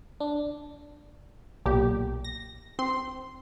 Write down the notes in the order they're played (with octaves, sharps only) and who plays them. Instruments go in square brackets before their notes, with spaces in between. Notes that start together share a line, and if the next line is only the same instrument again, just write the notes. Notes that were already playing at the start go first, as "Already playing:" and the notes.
[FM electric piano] D4
[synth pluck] B1 A#2 G4
A#6
C4 C6